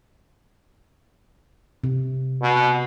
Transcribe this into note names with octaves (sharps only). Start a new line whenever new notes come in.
C3
B2